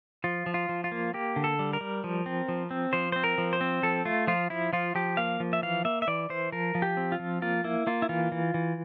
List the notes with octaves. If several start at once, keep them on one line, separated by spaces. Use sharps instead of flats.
F3 F4
F3
F4
F3
F4
A#3
A#3 G4
D3
A4
G3
A#4
G3
F3
C4
F3
C4
F3 C5
C4 C5
A#4
F3
C5
C4
F3 A4
A3 F4
F3 F4
F3 E4
F3 F4
F3 G4
A#3 F5
F3
E5
E3 F5
A#3 E5
E5
E3 D5
E3 C5
F3 A#4
F3
G4
C4
F4
F3
A#3 F4
A#3 E4
A#3 F4
E4
E3 F4
E3
E3